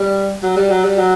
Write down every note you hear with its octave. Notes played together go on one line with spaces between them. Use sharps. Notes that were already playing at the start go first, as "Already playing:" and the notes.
Already playing: G3
F#3
G3
F#3
G3
F#3